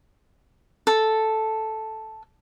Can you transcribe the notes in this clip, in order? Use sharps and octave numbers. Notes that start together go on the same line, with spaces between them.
A4